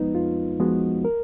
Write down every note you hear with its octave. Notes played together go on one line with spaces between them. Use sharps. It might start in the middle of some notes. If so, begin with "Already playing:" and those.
Already playing: F2 F3 G#3 B3 D#4 B4
F2 F4
F3 G#3 B3 F#4
A#4